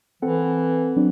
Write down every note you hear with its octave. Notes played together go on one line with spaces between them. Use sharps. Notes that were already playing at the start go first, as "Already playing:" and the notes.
E3 C4 A4 F#5
F#3 C4 D4